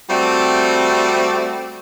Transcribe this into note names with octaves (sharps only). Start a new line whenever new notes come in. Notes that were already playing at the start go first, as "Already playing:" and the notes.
G3 A3 C4 F#4 D5